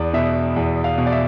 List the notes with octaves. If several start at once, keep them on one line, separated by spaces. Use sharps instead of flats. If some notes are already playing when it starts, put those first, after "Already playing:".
Already playing: E2 D5
B2 E5
E2
F5
B2
D5
E5